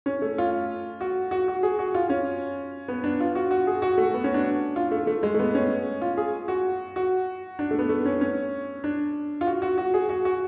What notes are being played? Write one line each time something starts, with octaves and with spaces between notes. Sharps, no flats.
C#4
A3
F4
F#4
F#4
F#4
G#4
F#4
F4
C#4
B3
D4
F4
F#4
F#4
G#4
F#4
A3
B3
C#4
D4
F4
A3
A3
G#3
A3
B3
C#4
F4
G#4
F#4
F#4
D4
A3
B3
A3
C#4
C#4
D4
F4
F#4
F#4
F#4
G#4
F#4
F#4